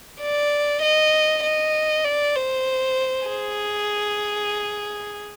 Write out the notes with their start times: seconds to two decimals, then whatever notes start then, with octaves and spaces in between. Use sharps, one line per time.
0.21 D5
0.82 D#5
1.44 D#5
2.04 D5
2.36 C5
3.27 G#4